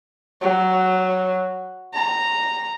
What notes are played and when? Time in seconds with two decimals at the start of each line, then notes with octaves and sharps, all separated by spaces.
0.41 F#3
1.94 A#5